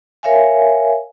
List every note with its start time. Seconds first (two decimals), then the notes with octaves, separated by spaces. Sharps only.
0.23 A#4 C#5 E5 F5 G#5